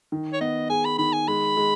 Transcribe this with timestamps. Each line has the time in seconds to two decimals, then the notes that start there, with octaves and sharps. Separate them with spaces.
0.12 D#3
0.33 C#5
0.41 B3 D#5
0.70 G#4 G#5
0.85 B5
0.98 D#3 B5
1.13 G#5
1.28 G#3 B5
1.57 G#3